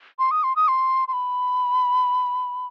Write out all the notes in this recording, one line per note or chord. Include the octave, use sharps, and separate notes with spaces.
C6
D#6
C6
D#6
C6
C6
B5